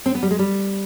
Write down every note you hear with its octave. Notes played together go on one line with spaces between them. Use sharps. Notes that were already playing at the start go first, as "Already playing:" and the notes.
C4
B3
G3
G#3
G3